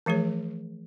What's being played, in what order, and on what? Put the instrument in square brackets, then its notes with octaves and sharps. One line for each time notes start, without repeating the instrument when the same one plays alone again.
[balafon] E3 F3 A3 G#4 C#5